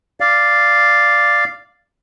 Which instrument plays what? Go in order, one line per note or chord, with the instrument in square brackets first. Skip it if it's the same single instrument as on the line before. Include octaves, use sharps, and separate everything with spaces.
[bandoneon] D5 F5